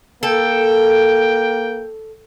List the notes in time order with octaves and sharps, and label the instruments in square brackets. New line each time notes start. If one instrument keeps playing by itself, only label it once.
[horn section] A#3 G5 [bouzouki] A4